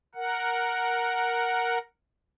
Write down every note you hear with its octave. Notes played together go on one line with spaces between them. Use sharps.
A#4 F#5